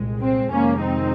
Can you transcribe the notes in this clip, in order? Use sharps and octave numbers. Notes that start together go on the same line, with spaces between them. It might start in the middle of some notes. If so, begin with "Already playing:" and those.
Already playing: C2 A#2 G#3
C4
F2 C3 D#3 G#3 A#3 C#4
C4 D#4